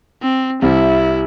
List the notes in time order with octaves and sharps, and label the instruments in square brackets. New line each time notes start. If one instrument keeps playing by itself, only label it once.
[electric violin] C4
[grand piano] C2 C3 G3 [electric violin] E4